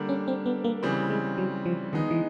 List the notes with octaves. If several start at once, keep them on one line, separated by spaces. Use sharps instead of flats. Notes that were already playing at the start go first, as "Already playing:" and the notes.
Already playing: D3 G3 A#3 D4
C#4
C4
B3
A#3
C#3 E3 G3 C4
G#3
F#3
F3
D#3 G#3 B3 D#4
E3